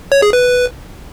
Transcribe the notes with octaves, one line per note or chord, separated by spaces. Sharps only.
C#5
G#4
B4